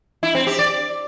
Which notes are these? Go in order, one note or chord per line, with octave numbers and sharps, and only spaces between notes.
E4
C4
G4
D5